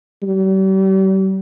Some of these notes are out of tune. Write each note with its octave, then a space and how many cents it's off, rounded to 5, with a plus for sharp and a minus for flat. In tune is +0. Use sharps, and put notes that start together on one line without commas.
G3 -40